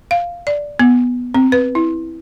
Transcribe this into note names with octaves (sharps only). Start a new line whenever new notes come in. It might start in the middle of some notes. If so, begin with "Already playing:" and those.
F5
D5
B3
C4
B4
E4